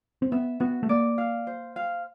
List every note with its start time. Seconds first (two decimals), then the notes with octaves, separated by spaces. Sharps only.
0.22 C4
0.32 B3 E5
0.60 B3 F#4
0.83 A3
0.89 A#3 D5
1.18 F5
1.47 C5
1.76 F5